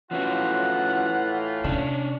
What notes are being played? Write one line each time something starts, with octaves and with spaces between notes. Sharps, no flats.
A2 E3 F3 C#4 F4 F#4 F#5
C3 C#4 D4